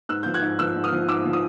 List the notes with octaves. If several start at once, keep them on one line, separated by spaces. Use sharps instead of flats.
G#2 E6 F#6
F3 G6
F#6 G#6
G#2
F3 E6 F#6
G#2
D#6 F6
F3
G#2 D6 E6
F3
D#6